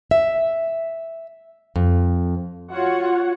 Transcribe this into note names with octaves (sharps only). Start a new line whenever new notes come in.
E5
F2
F4 F#4 C#5 F#5